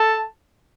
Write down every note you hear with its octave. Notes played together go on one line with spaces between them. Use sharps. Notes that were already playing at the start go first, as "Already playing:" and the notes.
Already playing: A4 A5